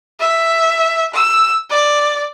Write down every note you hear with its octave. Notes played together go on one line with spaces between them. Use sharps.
E5
E6
D5